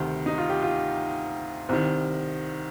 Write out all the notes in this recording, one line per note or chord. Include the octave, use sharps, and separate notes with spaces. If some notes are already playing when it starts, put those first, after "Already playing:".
Already playing: D2 C3 D#3
D#4
F4
G4
F4
C2 C3 D#3 C4